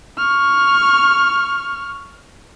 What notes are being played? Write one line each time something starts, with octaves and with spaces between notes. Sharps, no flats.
C#6 F6